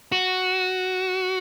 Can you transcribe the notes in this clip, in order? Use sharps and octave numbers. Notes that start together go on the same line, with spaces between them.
F#4